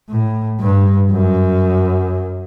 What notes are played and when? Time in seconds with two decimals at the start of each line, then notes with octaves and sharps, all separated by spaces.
0.10 A2
0.61 G2
1.12 F#2